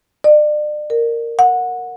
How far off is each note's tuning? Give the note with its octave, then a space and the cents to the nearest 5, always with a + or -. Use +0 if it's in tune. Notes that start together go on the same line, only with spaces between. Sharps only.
D5 +35
A#4 -10
F#5 -20